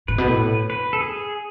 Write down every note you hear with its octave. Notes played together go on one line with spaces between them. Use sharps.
A2 B4
B2
A2
B4
A4
G#4